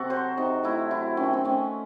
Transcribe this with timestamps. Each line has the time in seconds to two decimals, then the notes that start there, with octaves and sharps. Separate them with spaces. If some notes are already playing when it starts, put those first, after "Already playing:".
Already playing: C3 F#4 A4
0.10 F#3 C5
0.37 C3 D#4
0.63 A3 E4
0.91 F#3 E4
1.17 D#3 C#4
1.33 C4
1.44 A3 C#4